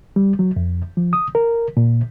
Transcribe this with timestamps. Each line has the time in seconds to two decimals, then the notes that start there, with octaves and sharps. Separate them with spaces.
0.16 G3
0.39 F#3
0.56 F2
0.97 F3
1.13 D#6
1.35 A#4
1.77 A#2